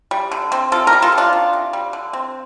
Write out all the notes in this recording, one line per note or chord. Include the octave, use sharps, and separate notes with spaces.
G3
D3
C4
C3 F4 A4
G4 A#4
G3
F4 A4
C4
D4 F4
D#3
C3
G3
D3
C4